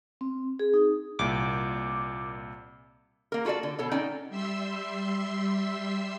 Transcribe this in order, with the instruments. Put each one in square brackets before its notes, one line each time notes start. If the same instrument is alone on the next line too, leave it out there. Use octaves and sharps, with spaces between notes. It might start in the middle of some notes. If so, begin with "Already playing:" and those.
[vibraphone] C4
G#4
D#4
[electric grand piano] C2 A#2 [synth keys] D6
[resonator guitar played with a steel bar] A#3 A#4
F4 F#4 A4 C#5 D5
D3
B2 A4 C#5
C#4 D#4 D5 G5
[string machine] G3 E5 C6 E6